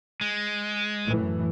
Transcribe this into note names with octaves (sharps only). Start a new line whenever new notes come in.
G#3
F#2 A2 E3